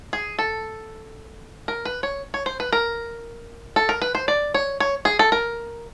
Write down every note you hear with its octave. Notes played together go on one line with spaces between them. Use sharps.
G#4
A4
A#4
B4
C#5
C#5
C5
B4
A#4
A4
A#4
B4
C5
D5
C#5
C#5
G#4
A4
A#4